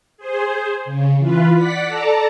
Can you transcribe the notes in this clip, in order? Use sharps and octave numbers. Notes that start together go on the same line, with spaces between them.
G#4 C5
C#3
E3 F4 B4
D5 F#5 B6
A4 D5 A5 A#5